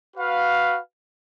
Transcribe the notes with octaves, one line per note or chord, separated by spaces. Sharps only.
F#4 B4 F5